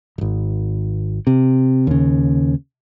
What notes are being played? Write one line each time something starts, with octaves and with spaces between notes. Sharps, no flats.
D#1 G#1
C3
D#2 C#3